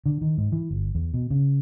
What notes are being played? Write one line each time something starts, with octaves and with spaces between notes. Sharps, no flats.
D3
D#3
G#2
E3
G1
E2
B2
C#3